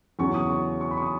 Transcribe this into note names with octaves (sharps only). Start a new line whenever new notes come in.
E2 C#3 F#3 C#6
D#6
C#6
C#6
B5
C#6
D#6